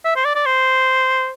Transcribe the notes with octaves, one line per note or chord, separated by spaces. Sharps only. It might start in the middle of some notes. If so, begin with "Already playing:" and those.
E5
C5
D5
D5
C5